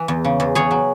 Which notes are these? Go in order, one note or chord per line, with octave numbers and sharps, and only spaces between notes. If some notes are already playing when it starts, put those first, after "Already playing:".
Already playing: E3 B4
E2
C#3
E2
E2 G#4 C#5
F#3